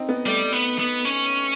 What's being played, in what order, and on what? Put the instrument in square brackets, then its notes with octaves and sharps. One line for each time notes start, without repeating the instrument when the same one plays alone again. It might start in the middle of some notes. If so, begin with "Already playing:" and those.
Already playing: [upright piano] C4 D#4
B3
[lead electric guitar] G3 [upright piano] A3
[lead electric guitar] B3
B3
C#4